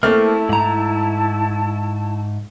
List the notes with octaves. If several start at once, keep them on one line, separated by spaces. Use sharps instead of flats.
A3 A#3 C4 E4 A5 F6
G#2 A#5